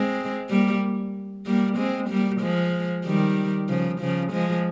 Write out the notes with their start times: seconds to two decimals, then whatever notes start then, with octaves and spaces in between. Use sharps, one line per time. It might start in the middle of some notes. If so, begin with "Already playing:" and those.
Already playing: G#3 C4
0.50 G3 A#3
1.46 G3 A#3
1.77 G#3 C4
2.09 G3 A#3
2.41 F3 G#3
3.06 D#3 G3
3.69 C#3 F3
4.00 C#3 F3
4.32 F3 G#3